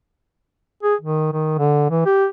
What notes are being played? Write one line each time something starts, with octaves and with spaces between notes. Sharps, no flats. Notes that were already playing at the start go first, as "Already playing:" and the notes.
G#4
D#3
D#3
D3
E3
G4